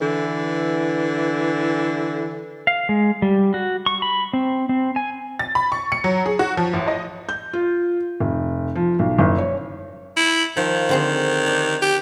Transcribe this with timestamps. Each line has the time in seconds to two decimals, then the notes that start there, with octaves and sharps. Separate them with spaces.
0.01 D3 E3
2.67 F5
2.89 G#3
3.22 G3
3.54 F#4
3.86 C#6
4.02 B5
4.33 C4
4.69 C4
4.96 G#5
5.39 A6
5.55 B5
5.72 C#6
5.92 C#7
6.04 F#3
6.26 G#4
6.39 F#4
6.57 F3
6.73 A1
6.88 D#5
7.29 G6
7.53 F4
8.20 F1
8.75 F3
8.99 B1
9.19 F#1
9.38 C#5
10.17 E4
10.57 D#3 F3
10.89 D3 C4 G#4
11.47 D4
11.82 G4